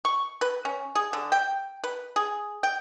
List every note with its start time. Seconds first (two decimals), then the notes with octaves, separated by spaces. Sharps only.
0.05 C#6
0.41 B4
0.65 C#4
0.95 G#4
1.13 D3
1.32 G5
1.84 B4
2.16 G#4
2.63 G5